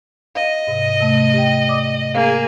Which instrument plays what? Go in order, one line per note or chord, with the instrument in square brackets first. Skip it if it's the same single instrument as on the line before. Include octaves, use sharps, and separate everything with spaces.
[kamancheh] D#5 [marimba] F5
[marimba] G#2 C3
C3 A3
G4 G5
D5 D6 D#6
[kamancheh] A#3 G#4 [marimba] F5